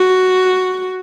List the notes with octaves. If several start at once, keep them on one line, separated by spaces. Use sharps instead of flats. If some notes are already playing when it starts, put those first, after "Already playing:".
Already playing: F#4